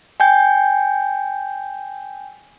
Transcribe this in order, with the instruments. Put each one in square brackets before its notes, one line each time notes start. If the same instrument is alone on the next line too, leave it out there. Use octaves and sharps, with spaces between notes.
[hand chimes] G5 G#5 G6